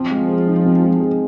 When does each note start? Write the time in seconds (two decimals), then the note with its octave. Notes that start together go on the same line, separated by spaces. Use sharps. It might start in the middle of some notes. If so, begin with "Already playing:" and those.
Already playing: F3 C4
0.11 G#3
0.29 G#4
0.47 D#4
0.65 C4
0.82 G#3
1.00 G#4